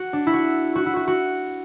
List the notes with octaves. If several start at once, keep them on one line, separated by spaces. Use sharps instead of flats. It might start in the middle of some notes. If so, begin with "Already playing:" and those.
Already playing: F#4
D4
E4
F#4
F#4
E4
F#4
F#4